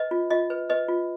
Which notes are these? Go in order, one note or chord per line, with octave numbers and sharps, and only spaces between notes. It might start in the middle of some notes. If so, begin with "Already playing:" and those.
Already playing: B4 D#5
F4
F4 D#5
B4
B4 D#5
F4